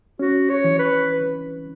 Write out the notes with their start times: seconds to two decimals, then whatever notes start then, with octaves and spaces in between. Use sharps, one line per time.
0.19 C#4 F#4
0.49 C#5
0.64 E3
0.79 B4